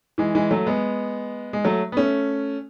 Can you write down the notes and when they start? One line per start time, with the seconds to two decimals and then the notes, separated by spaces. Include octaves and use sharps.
0.18 E3 G#3
0.35 E3 G#3
0.51 F#3 A3
0.67 G#3 B3
1.53 G#3
1.65 F#3 A3
1.92 B3
1.97 A3 C#4